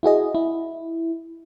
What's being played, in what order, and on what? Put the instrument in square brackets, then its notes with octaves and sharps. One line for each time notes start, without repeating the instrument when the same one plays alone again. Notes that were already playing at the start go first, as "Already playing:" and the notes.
[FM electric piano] E4 F#4 G#4 D#5
E4